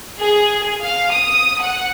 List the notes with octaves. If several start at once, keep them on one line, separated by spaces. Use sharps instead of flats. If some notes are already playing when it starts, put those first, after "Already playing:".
G#4
F5
D#6
F#5